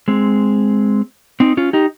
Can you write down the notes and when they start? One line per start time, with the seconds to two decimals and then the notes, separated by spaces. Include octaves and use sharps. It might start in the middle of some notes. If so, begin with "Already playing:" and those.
0.08 G#3 C4
1.40 C4 D#4
1.57 C#4 F4
1.73 D#4 G4